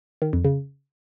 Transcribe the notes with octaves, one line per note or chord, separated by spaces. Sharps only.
D#3
F2
C#3